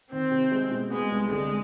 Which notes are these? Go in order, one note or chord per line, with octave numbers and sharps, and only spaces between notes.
D#3 C4
C3
G#3
B2
G#3 B3
C2
D3 G#3